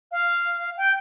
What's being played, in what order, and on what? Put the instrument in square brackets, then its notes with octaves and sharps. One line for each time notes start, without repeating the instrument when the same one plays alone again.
[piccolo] F5
G5